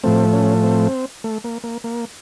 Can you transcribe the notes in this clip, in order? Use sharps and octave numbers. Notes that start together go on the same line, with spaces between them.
A2 F3 A3 C4
C#4
C4
A3
A#3
A#3
A#3